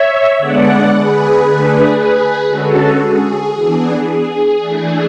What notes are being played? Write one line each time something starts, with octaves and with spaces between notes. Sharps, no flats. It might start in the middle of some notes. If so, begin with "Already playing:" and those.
Already playing: C#5 E5
D3 G#3 B3 D4 D5 F#5
G#4 B4
D3 A3 D4
G#4 B4
D3 G#3 C#4 F#4 A4
G#4
E3 B3 D4
G#4
E3 A3 D4